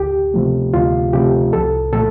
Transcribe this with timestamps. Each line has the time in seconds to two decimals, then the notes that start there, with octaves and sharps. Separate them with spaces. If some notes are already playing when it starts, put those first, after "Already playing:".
Already playing: D2 G4
0.34 C3 F3 A3
0.73 D2 F4
1.13 C3 F3 A3 G4
1.53 C2 A4
1.92 A#2 F3 A3 A4